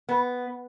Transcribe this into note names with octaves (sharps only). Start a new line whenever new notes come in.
B3